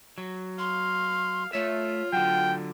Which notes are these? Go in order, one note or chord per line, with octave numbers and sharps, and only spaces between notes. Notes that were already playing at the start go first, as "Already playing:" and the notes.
F#3
F5 C6
A3 F4 C#5 E5
D3 F#3 F#5 G5